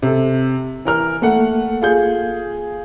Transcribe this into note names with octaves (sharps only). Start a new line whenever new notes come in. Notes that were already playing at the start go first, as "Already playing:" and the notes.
C3 A4
E3 A#4 F6
A3 A#3 A4 F#5
F4 G#4 G6